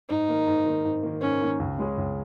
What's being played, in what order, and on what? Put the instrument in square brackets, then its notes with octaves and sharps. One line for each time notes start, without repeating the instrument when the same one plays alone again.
[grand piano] G#2 [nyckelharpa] D#4
[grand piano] D#3 A#3
G#2
D#3 A#3
G#2
D#3 A#3
[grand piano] G#2 [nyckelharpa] C#4
[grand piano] D#3 A#3
C#2
C#3 G#3 C#4 G#4
C#2